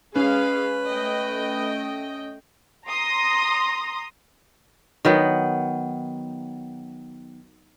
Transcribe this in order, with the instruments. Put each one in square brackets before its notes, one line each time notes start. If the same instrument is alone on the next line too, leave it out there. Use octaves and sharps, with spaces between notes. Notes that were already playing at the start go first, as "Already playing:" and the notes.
[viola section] G#3 G#4 F5 [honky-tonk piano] C#4 [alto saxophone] B4
[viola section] A3 D#5 G5
[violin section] A#5 C6 D#6 A#6
[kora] D#3 F#3 B3